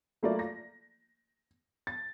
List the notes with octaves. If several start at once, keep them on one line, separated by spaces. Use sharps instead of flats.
F#3 A3 A#3 E4 F4 D5
A#6
A6